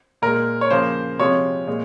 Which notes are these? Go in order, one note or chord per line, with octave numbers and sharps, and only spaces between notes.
A#2 G#3 A#4
C#5
C#3 F3 A#3 C5
C3 F3 G#3 C#5
A#2 G#3